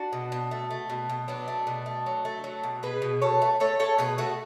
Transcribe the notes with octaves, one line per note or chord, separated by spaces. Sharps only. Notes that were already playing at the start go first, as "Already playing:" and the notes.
Already playing: D4 F#4
B2
B2
A3
A3
B2
B2
F#3 B3 D4
A3
B2
A3
F#3
A3
F#3
B2
B2 G#4 B4
B2
B2 A4 C#5
A3
A3 A4 C#5
A3 A4 C#5
B2 G#4 B4
A3 F#4 A4